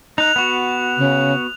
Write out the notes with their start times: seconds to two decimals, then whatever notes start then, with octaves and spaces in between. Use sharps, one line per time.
0.18 D#4 F#6 F7
0.36 B3 F#4
0.98 C#3